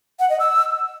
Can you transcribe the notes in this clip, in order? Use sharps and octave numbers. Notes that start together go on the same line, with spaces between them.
F#5
D#5
E6